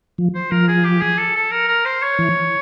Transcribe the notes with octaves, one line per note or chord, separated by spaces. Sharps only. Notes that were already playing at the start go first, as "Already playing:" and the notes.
F3
C5
F3 A#4
G#4
G4
G#4
A4
A4
A#4
A#4
C5
C#5
E3